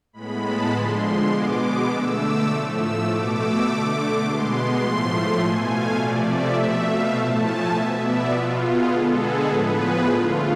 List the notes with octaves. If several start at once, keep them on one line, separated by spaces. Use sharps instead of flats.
A2 G#3 B3 B5
A5
D3 F3 G#3 C6
B2 G#3 B3 D6
D6
D3 A3 E6
D6
A2 F3 A3
E6
B2 A3 D6
E6
D3 A3 D6
B2 G#3 B3 C6
C6
A2 F3 A3
B2 A3 G#5
F5
C3 F3 A3 D5
E5
B2 A3
F5
A2 F3 A3 A5
G#5
B2 B3 E5
D5
B2 B3 F4
G#4
D3 G#3 B3 A4
G#4
A2 F3 B3 B4
G#4
D3 A3 F4